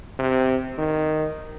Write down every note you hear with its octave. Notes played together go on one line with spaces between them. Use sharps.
C3
D#3